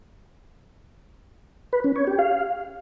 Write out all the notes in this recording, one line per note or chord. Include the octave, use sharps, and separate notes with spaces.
B4
C#4
C#5
G4
F5